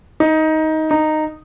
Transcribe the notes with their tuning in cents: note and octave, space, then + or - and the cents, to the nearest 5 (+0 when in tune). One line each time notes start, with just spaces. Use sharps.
D#4 +15
D#4 -10